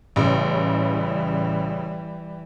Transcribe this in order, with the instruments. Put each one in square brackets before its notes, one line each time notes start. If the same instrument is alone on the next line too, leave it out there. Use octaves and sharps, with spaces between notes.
[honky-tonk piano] A1 C#3 [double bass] E3 G3